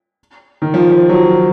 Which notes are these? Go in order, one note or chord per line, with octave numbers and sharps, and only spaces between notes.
D#3
F3
F3
F#3